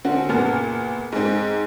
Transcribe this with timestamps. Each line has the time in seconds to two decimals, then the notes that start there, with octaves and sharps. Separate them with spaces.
0.05 D3 C4 C#4 F#4
0.29 F#1 A#2 B3 A5 F6
1.12 G#2 C4